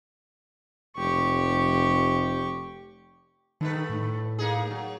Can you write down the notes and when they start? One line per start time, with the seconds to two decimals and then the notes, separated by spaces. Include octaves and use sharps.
0.97 F1 G4 C#6
3.61 G2 D#3 A3 B4
3.90 A2
4.39 A#3 D#4 G#4
4.71 F#3